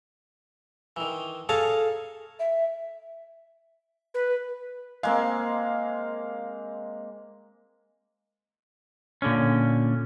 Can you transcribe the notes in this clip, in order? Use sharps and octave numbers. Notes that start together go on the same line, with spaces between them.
D#3 E3
G#4 A4 C#5 F5 A5 A#5
E5
B4
G#3 A#3 C4 F5
A#2 D3 C#4